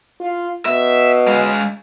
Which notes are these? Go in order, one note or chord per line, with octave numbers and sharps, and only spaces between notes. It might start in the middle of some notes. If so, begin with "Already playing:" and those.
F4
B2 E5
G#3 F5